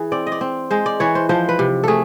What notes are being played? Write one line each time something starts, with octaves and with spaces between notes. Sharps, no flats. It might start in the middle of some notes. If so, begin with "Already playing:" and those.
Already playing: E3 G#4
C4 D5
D#5
D5
C4
G#3 C5
D5
E3 C#5
C5
F3 C5
B4
C3
A3 G#4 A4